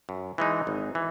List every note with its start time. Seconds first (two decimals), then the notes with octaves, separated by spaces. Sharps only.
0.09 F#2
0.38 E3 G#3 D#4
0.67 G#1
0.95 E3